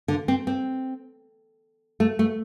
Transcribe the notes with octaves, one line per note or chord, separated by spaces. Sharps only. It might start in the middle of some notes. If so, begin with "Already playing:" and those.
D3
C4
C4
A3
A3